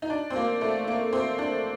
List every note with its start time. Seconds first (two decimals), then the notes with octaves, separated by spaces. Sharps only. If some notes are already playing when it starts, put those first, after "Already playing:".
0.02 D#4
0.10 D4
0.30 C4
0.36 A#3
0.61 A3
0.87 A#3
1.13 C4
1.38 D4